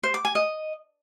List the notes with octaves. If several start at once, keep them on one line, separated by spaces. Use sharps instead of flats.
C5
D6
G#5
D#5